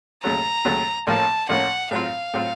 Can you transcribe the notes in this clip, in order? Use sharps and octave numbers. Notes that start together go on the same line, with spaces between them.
D#2 C#3 F#3 A3 A#5
D#2 C#3 F#3 A3
A1 A2 F3 A#3 C#4 A5
A1 A2 F3 A#3 C#4 F#5
A2 F#3 C4 F4 F5
A2 F#3 C4 F4